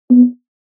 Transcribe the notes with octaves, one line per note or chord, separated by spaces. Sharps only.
B3